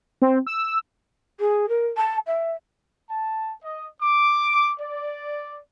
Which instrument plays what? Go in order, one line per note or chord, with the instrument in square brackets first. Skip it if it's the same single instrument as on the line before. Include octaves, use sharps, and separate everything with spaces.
[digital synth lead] C4
E6
[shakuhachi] G#4
A#4
A5
E5
[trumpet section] A5
D#5
D6
D5